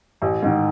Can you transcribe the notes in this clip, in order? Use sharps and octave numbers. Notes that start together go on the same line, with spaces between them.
A1
G#2 D#3